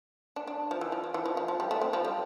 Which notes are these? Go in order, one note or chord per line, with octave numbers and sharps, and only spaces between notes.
D4
D4
F3
E3
F3
F3
E3
F3
F3
F3
G3
A3
C4
F3
G3